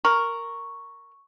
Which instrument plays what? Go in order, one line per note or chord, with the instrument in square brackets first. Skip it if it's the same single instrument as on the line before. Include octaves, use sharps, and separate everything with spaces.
[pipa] A#4 [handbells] C#6